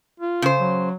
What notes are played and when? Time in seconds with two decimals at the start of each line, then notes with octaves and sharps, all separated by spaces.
0.20 F4
0.42 C#3 C5
0.60 F#3